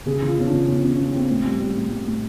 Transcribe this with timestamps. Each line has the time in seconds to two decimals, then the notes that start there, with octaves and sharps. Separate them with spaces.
0.06 C#3 G#4
0.21 E3
0.27 F4
0.37 E2 C#4
0.47 D4
0.53 C#3
0.67 E2 C#4
0.83 E2 C#4
0.98 E2 C#4
1.14 E2 C4
1.30 A2
1.45 G3
1.60 G3
1.76 A2
1.91 A2
2.07 A2